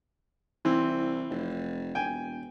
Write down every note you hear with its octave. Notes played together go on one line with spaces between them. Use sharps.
C2 E3 C4
F1
E1 G5 G#5